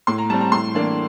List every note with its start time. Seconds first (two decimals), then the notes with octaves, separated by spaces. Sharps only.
0.07 A2 C6
0.18 A#5
0.30 G3 C4 A5
0.41 A#5
0.52 A2 C6
0.74 E3 A#3 D4